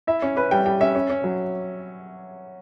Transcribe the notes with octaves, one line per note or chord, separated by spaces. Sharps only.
E4 E5
C#4
C#4 B4
G3 G5
G3 G5
C#4 E5
C#4
C#4
F#3